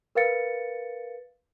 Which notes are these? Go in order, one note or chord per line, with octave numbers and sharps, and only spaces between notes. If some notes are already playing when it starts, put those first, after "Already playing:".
A#4 B4 F5 A6 C#7